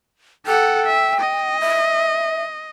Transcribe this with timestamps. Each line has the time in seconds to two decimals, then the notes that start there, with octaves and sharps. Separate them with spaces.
0.46 A4 F#5 G5
0.86 E5
1.20 D#5
1.60 E5